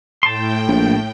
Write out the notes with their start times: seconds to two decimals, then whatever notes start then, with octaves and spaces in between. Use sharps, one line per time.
0.23 A2 G5 A5 C6
0.68 A#1